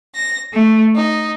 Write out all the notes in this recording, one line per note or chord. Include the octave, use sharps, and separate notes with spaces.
A#6
A3
D#4